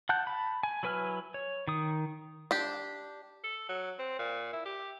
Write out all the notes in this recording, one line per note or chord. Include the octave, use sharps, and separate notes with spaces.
F#5 A5 F#6 G6
A5 B5
G#5
F#3 E4 B4 G#5 F6
C#5
D#3 D#6
D4 G4
A4
F#3
C4
A#2
E4
G4